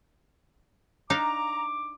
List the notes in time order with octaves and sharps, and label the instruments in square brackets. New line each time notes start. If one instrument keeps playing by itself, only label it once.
[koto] D4 D#4 F5 [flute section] A#5 [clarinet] D6